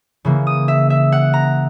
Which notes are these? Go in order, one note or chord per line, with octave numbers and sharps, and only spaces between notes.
C#3 E3 A#3
D#6
E5
E5
F#5
A#5